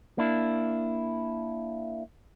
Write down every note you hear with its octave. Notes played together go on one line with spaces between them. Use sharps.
A#3 D4 E4